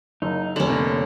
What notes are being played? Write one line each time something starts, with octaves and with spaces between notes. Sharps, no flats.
F#1 D#4
F1 D3 C#4 F#7
C3 A#3